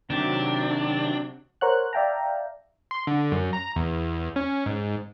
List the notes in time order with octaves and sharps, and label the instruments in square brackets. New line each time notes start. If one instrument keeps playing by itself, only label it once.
[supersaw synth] C3 F#3 [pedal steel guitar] D#3 C4 G4 [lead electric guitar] D4
[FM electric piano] A#4 C5 C#5 F#5 F#6
D5 E5 F5 G5 A5 A#5
[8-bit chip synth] C6
D3
F#2
A#5
E2
C#4
G#2